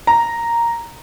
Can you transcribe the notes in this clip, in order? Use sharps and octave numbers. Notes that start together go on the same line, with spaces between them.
A#5